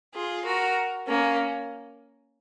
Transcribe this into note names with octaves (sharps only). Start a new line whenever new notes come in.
F4 G#4
F#4 A#4
A#3 C#4